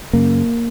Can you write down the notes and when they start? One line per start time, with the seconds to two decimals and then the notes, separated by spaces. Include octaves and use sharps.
0.13 F#2 C#3 A#3